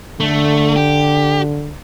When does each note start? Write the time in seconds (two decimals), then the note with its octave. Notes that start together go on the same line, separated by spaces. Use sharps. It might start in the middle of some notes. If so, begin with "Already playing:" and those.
0.20 D3 A3
0.76 G4